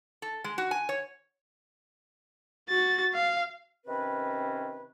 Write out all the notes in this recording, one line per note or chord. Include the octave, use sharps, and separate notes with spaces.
A4
G#3
F#4
G#5
C#5
F#4 A6
F5
C3 D#3 C4 C#4 B4